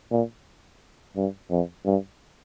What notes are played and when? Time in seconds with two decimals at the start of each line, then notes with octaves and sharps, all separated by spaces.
0.11 A#2
1.16 G2
1.51 F2
1.86 G2